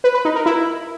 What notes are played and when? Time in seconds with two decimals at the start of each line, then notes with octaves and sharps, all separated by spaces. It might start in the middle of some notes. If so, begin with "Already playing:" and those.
0.04 B4
0.14 B4
0.25 D#4
0.35 A#4
0.46 E4